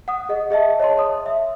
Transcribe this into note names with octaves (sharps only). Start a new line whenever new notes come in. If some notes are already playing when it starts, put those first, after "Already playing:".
F#5 D#6
G#4 D#5 F#5
G#4 D#5 E5 A5
C#5 D#5 A5 C6
C6 D#6
E5